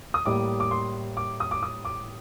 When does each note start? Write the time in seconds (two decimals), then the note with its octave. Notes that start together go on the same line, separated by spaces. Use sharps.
0.14 D#6
0.26 A2 G3 A#3 D6
0.60 D6
0.71 C6
1.17 D6
1.40 D#6
1.51 D6
1.63 D#6
1.85 D6